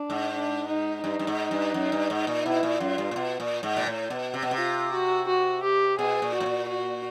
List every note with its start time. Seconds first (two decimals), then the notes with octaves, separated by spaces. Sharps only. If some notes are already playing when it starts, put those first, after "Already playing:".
Already playing: D4
0.10 G#2
0.34 D4
0.68 D#4
1.03 G2 D#4
1.19 G2
1.27 G#2
1.51 G2
1.74 F#2
1.92 G2
2.10 G#2
2.27 A#2
2.45 B2 E4
2.63 A#2
2.80 F#2 F4
2.98 G2
3.11 A#2
3.16 B2
3.40 A#2
3.63 G#2
3.76 A#2
3.86 A2
4.10 B2
4.34 C3
4.42 B2
4.51 C3
4.57 F4
4.93 F#4
5.28 F#4
5.63 G4
5.99 B2 G#4
6.22 A#2
6.34 F#4
6.40 A2
6.46 A#2
6.69 F#4